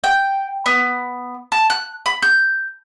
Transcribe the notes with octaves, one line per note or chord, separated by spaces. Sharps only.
G5
B3
A5
F#6
B5
G6